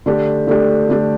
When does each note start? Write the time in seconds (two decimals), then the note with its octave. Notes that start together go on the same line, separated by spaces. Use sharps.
0.06 D3 A3 D4 G4
0.47 D3 A3 D4 G4
0.89 D3 A3 D4 G4